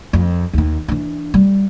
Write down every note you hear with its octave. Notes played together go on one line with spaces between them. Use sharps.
F2
D#2 D#3
E3 D4
G3